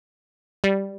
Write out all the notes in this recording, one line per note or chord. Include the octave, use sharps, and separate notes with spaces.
G3